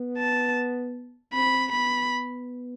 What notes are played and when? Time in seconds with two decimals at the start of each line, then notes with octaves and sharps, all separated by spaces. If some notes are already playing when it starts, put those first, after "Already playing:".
Already playing: B3
0.18 A5
1.33 C4 B5
1.72 B3 B5